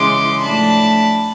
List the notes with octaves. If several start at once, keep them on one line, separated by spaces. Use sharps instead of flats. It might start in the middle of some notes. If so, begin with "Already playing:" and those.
Already playing: C#3 E3 G#3 C6 D6
A2 F3 A3 D4 A5 B5